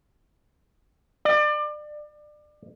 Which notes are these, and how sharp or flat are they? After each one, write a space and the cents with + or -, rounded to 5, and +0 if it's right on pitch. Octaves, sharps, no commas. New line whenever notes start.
D5 +30